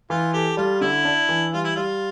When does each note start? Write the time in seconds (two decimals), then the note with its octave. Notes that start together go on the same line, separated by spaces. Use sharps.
0.10 E3 F4
0.33 G4 A4
0.57 G3 F4
0.81 D3 E4
1.05 D4
1.29 E3
1.53 G3 F4
1.64 E4
1.76 G3 F4